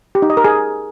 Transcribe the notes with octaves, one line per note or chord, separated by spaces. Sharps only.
G4
D#4
D#5
A#4
G#4